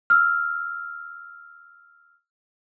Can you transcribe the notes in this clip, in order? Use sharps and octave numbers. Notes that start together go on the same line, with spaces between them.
E6 F6